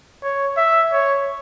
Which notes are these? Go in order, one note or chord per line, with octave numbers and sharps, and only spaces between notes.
C#5
E5
C#5